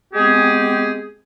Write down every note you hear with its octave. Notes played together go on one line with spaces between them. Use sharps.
G#3 B3 C4 G4 G#4